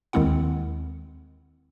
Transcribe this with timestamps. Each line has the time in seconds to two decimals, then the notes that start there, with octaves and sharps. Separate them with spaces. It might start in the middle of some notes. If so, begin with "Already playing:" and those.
0.13 D#2 D#3 G#3 C4 E4 F#5